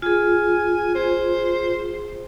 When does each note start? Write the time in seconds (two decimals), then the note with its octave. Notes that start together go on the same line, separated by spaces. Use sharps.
0.02 F4 G#4 G#5
0.95 C5